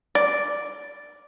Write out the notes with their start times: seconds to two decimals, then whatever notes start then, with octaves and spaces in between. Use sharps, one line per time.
0.15 D5